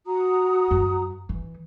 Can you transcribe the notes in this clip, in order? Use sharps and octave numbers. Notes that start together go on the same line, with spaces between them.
F#4 A#5 D#6
F#2
E3